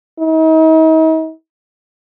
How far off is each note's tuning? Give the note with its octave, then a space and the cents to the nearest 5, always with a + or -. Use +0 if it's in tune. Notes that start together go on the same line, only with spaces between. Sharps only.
D#4 +40